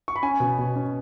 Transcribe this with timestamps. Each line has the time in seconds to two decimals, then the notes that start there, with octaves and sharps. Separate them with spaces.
0.08 C#6
0.16 B5
0.22 C#4 G#5
0.40 B2
0.58 B2
0.76 C#4